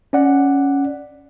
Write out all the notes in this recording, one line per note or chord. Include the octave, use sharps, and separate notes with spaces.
C#4 D5 F#5